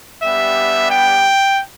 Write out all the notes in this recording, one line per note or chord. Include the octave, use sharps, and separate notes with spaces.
G3 B3 D4 G4 E5
G5